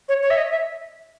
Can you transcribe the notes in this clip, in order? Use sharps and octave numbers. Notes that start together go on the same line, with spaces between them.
C#5
C#5
E5
D#5
E5